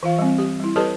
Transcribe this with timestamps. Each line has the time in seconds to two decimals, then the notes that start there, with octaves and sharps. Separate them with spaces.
0.03 E3 F4 F5
0.19 G3 C4
0.38 G4
0.60 G3 E4
0.76 G4 A4 B4 C#5 D#5 A5